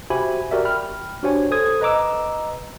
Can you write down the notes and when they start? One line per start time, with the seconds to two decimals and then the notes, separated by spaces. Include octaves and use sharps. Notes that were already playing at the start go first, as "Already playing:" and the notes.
0.10 F#4 G4 C5 E5 G#5 B5
0.51 F#4 G4 A#4 D5 E5
0.65 G5 B5 F6
1.23 D4 F#4 G4 C5 C#5 G#5
1.51 A4 C5 D#6 G#6
1.81 B4 D#5 A#5 D6 E6